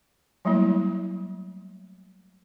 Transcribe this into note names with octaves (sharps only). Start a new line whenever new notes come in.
F#3 G3 A3 A#3 E4